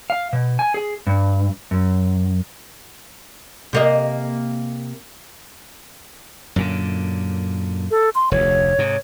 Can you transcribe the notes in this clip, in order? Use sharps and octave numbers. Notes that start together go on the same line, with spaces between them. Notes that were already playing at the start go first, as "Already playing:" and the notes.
F5
B2
G#5
G#4
G2
F#2
C3 A#3 D#5
F#2 A#2 D3
A4
C6
F1 D2 C#5
G#2 C3